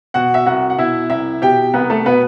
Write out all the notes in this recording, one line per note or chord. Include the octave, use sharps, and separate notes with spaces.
B2 F#4 F#5
E5
C2 F#4 F#5
F#5
B2 E4 E5
C2 E4 E5
B2 G4 G5
C2 B3 B4
A3 A4
B2 B3 B4